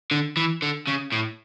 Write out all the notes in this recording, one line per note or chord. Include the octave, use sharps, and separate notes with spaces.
D3
E3
D3
C#3
A2